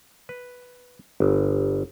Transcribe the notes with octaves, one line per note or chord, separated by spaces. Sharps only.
B4
G1